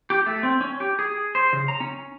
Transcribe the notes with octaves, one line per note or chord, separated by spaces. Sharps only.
G4
A3
C4
C#4
G4
G#4
C5
C#3
A#5
C#4